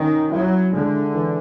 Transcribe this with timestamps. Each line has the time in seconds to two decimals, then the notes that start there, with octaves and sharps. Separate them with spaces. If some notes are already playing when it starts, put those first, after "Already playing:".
Already playing: D#3 C#4
0.32 F#3 E4
0.73 D3 G#3
1.14 E3